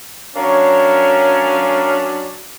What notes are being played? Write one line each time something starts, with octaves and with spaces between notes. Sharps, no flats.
F#3 C#4 D4 A#4 C#5 F5